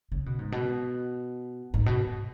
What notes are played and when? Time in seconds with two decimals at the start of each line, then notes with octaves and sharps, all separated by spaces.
0.12 C#3
0.26 B2
0.39 G#2
0.52 B2
1.74 G#2
1.86 B2